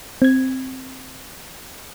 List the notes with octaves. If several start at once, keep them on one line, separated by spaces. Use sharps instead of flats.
C4 G#6